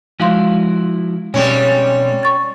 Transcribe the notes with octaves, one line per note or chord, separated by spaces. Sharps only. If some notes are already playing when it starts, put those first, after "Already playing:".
F3 G#3 E4 F#4 F5 C6
B2 G3 G#3 C4 C#4 C#5
C#5
C#6 A6